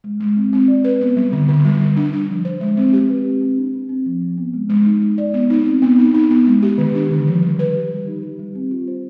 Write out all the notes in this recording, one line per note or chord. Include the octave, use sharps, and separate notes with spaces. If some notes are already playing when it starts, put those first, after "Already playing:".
G#3
G#3
C4
C4
D5
B4
B3
G3
D3
D3
G3
G3
D4
D4
F3
C5
G#3
C4
G4
B4
C4
C4
D4
D4
C4
F3
F3
B3
G#3
G#3
D#4
D#4
D5
B3
D#4
C4
B3
D#4
D#4
B3
G#3
G4
D#3
D4
D3
F3
G3
B4
G4
G3
D#4
G4
G3
C4
F4
C5